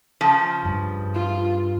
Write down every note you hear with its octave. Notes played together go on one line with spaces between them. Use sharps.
C#3 F3
G2
F4